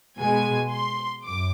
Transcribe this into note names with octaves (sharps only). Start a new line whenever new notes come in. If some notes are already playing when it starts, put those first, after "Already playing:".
B2 G#3 G#5
C6
F#2 D6